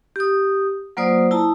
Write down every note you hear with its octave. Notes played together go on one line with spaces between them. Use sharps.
G4 D#6
F#3 A#3 F4 C5 D5 D#6
E4 A5 A#5 D#6